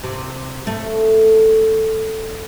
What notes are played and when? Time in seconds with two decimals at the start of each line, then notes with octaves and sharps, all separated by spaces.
0.03 C3
0.67 A3